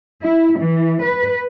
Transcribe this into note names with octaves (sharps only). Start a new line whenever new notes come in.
E4
E3
B4